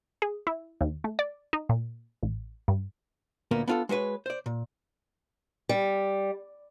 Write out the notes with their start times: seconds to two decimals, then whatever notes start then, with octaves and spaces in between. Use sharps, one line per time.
0.22 G#4
0.47 E4
0.81 D#2
1.04 A3
1.19 D5
1.53 D#4
1.69 A#2
2.23 A1
2.68 G2
3.51 D2 A#2 A#3 B3
3.68 B3 D4 F4 G#4 A4
3.89 G#3 F#4 A#4 B4 C#5
4.26 C5 D5
4.46 A#2
5.69 G3